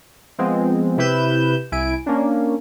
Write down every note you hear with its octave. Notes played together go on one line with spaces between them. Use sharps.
F3 G#3 B3 C4
C3 E4 G4 B4 G6 E7
C2 E4 G#5 D7
A#3 C#4 D4